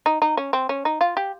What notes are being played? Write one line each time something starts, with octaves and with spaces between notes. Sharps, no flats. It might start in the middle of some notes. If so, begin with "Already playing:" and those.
D#4
D#4
C#4
C4
C#4
D#4
F4
G4